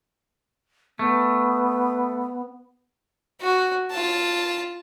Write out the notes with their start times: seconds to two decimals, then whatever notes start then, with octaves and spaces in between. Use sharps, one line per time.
0.99 A3 B3
3.41 F#4
3.91 F4 A5